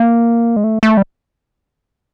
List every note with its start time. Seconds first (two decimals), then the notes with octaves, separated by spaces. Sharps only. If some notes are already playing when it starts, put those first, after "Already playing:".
Already playing: A#3
0.56 G#3
0.64 A3
0.83 A3
0.97 G3